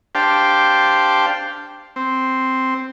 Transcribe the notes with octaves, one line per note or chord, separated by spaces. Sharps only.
D4 G4 C5 F5 G5 A5
C4